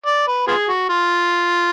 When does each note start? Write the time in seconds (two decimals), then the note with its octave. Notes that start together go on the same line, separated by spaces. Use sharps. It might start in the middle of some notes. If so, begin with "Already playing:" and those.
0.06 D5
0.27 B4
0.47 B3 F4 G#4
0.68 F#4
0.89 F4